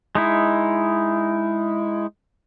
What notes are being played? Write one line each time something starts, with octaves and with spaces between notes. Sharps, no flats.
G#3 D#4 E4